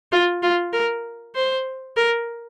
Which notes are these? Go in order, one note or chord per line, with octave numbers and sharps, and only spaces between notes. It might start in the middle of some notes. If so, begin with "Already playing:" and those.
F4
F4
A#4
C5
A#4